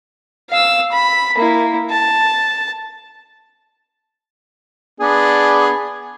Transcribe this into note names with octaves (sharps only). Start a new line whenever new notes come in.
F5 E6
B5
A#3 E4
A5
B3 D4 G#4